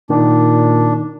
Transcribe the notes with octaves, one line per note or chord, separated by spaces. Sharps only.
A#2 D#3 D4